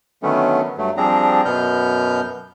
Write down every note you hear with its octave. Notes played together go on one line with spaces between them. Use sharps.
D3 D#3 F#3 A3 B3 C#4
G2 F#3 A3
F3 G3 C4 D4 G#4 A#5
F#2 B2 B3 F6 G6